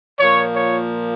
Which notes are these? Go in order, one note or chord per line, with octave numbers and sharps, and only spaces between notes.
A#2 F3 A#3 C#5
C#5